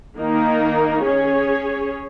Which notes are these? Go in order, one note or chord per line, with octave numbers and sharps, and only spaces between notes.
D#3 A#3 D#4 A#4
C#4 G#4 C#5